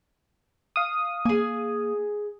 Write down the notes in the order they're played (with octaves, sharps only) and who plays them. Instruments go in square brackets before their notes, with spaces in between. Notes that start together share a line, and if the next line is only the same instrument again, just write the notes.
[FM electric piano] F5 D#6
[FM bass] A#3 [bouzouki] G#4 G#5